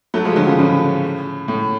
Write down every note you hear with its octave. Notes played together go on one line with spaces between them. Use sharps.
F#3 A3
F3 G#3
D3 F#3
C#3 F3
A2 C#3
A2